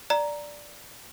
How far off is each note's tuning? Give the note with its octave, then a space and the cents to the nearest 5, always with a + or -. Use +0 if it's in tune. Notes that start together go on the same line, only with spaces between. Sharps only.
D5 +0 A#5 +0